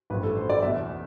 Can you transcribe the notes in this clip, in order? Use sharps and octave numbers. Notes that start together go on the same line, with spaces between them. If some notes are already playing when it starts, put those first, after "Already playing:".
A1 G2 F3 B4
A4
C5
D5
E2 B2 E5